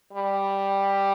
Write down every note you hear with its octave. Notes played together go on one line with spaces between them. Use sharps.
G3